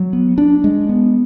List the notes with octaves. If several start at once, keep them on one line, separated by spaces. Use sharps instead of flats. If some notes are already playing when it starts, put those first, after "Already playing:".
Already playing: F#3
B3
D4
G#3
B3